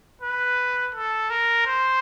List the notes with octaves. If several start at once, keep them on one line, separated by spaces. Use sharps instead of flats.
B4
A4
A#4
C5